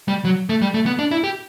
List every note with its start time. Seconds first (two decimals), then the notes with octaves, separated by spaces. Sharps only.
0.08 G3
0.25 F#3
0.49 A3
0.62 G3
0.74 A3
0.86 B3
0.99 D4
1.11 E4
1.24 G4